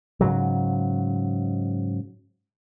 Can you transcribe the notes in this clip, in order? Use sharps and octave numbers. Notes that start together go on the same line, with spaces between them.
G#2 C#3 F#3